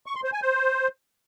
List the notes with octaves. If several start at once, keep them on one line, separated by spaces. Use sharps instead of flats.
C#6
C6
C5
G#5
C5